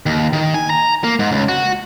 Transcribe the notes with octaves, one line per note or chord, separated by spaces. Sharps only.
D#2
D#3
G#5
A#5
A#3
G#2
C#2
F#4